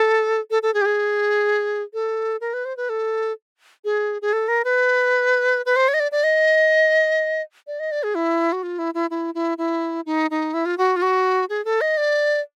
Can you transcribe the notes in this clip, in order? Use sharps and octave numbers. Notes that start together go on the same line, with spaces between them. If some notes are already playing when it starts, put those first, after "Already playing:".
Already playing: A4
A4
A4
G#4
G4
G#4
A4
A#4
B4
C5
B4
A4
G#4
G#4
A4
A#4
B4
B4
C5
C#5
D#5
D5
D5
D#5
D5
D#5
D5
G#4
E4
F#4
F4
E4
E4
E4
E4
E4
D#4
D#4
E4
F4
F#4
F4
F#4
G#4
A4
D#5
D5